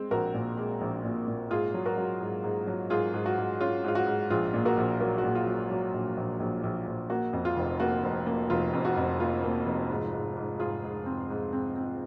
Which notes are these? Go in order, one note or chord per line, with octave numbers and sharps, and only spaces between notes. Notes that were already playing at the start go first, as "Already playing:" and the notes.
Already playing: G#3 C4
A#1 F#4 A#4
A#2
G#3
A#1
A#2
A#2
G#2 F4 G#4
F#3
F#4 A#4
F#3
G#2
G#2
F#3
G#2 F4 G#4
G#2
F#4
G#2
C#4 F4
G#2 F4
F#4
G#2
A#1 F4 G#4
A#2
F#4 A#4
A#1
F#3 F#4 A#4
F#4
A#2
F4
F#3
F#3
A#1
A#1
A#1
A#1
A#1
A#3 F#4
F2
F4
F1
A#3 F#4
F1
A#3
F1 F4
F2
F#4
F2
A#3 F4
A#3
F1
G#2
G#2
G#2
G#2 F4 G#4
G#2
C4
G#2
C4
C4